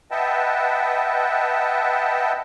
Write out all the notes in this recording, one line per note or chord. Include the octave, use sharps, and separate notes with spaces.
B4 D#5 E5 F#5 G5 A5